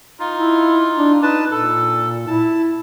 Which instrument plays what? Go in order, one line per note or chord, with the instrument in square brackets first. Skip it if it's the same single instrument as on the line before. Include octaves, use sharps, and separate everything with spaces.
[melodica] D#4 F4
[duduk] E4
D4
[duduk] D#4 [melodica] B4 A5
[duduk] A#2 [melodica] A4
[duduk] E4 [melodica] A5